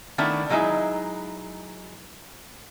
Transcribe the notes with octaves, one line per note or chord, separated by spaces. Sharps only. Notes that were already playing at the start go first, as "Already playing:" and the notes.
D#3 A3 B3 D4 E4
D3 F#3 G#3 C4 D#4 E4